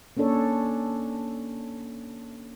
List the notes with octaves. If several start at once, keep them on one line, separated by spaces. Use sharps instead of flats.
A#3 C#4 D4 A4 C#5